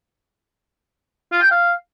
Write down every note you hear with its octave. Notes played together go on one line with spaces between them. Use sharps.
F4
G5
F5